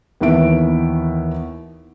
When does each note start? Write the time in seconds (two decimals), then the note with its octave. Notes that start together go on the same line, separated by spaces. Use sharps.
0.21 D#2 D#3 E3 B3 E5 D7